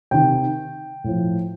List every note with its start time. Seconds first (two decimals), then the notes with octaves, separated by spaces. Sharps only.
0.11 C3 D#3 G5
1.04 A2 F3